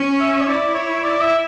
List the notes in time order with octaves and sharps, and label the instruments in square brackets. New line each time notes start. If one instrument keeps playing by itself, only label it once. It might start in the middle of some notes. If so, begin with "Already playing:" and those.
Already playing: [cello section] C#4
[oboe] E5
C#5
[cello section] E4 [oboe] D5
[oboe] C#5
D5
E5